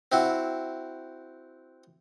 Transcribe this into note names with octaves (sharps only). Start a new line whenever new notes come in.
C4 E4 F#4